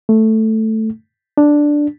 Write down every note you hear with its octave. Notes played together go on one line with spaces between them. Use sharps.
A3
D4